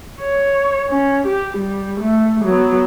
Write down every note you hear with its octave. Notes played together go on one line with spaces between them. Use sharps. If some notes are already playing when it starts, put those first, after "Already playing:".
C#5
C#4
G4
G3
A3
F#3 B3